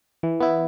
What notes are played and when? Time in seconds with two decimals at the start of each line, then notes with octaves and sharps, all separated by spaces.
0.23 E3
0.40 B3 E4